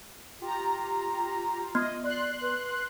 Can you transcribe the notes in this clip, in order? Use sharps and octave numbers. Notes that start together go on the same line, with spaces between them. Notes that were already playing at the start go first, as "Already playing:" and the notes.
F4 G4 A#5
B3 D#5
D5 C6 F#6
B4